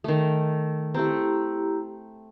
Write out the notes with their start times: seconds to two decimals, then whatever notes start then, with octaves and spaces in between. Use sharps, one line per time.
0.04 D#3 A3
0.95 A3 C4 E4 G4 A#5